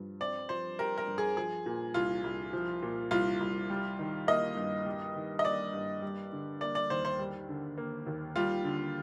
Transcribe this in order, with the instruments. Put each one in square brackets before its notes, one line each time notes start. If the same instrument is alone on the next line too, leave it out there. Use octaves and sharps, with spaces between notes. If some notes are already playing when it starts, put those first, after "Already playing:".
Already playing: [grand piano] G2 F3
[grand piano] C4 [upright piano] D5
[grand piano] F3 [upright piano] C5
[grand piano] G4 [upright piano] A#4
[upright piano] A#4
[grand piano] G2
[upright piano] G#4
[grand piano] F3 [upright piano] G#4
[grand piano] A#2
[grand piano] C2 [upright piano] F4
[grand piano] C2
F3
A#2
[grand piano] C2 [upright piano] F4
[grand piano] C2
G3
D#3
[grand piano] A#3 [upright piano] D#5
[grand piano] G2
G3
D#3
[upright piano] D#5
[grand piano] A#3 [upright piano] D5
[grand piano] G2
G3
D3
[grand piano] A#3 [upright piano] D5
[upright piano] D5
[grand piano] D#2 [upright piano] C5
[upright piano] C5
[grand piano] G3
D3
A#3
D#2
[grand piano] G3 [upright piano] F4
[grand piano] D3